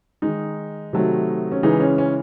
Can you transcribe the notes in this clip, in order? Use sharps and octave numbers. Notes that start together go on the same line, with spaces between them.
D#3 G#3 D#4
C3 D#3 F#3 A3
C#4
C#3 E3 G#3 D#4
C#4
C#4